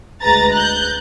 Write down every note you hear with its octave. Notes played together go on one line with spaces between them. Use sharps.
D2 G#3 B4 A#5 A6
F#6 G6